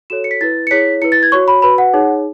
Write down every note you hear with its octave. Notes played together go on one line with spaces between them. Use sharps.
F#4 A4 C#5 E7
C#7
B6
E4 B4 A6
C#7
E4 G#4 C#5 B6
E4 B4 C#7
A6
G#6
F#4 C#5 C#6
B5
F#4 B4 B5
F#5
D#4 G#4 C#5